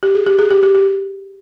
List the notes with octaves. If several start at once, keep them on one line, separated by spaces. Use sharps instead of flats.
G4
G#4
G4
G#4
G4
G4
G4